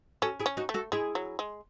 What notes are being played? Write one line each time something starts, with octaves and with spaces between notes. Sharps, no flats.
C#4 F#4 A4
E4 G#4
C#4
D#4 F#4
A3
F#4 A4
G#3 E4 G#4
F#3
G#3